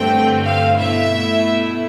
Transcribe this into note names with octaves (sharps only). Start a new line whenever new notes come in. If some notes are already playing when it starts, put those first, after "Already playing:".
Already playing: G2 D3 A3 C4 G5
F5
B2 A3 E4 E5